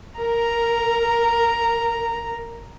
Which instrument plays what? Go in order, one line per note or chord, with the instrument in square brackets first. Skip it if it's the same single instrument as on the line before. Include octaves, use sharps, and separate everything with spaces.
[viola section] A#4 [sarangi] A#5